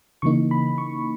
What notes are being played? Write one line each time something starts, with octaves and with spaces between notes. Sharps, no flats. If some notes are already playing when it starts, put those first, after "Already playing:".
C#3 E3 A#3 D#4 C#6
B5
C#6